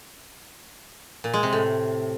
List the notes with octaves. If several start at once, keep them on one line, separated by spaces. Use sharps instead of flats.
A#2
G#3
C3
A2